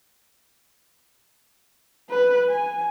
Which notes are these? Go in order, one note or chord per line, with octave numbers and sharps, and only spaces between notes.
B4
G#5